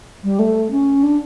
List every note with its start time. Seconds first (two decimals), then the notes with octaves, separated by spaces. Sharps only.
0.24 G3
0.39 A3
0.71 C#4
1.03 D4